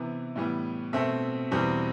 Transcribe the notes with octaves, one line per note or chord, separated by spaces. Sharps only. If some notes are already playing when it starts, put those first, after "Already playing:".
Already playing: C3 E3 B3
A2 E3 G3 B3
B2 A3 C4 E5
E2 B2 G3 C4